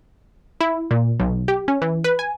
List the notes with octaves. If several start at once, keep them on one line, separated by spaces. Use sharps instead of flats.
E4
A#2
B1
G4
C#4
E3
B4
G#5